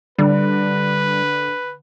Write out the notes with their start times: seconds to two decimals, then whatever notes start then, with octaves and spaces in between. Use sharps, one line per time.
0.18 D3 G3 B4